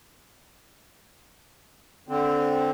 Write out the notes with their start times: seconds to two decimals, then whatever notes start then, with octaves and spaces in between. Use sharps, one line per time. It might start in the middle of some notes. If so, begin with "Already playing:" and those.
2.08 D3 C4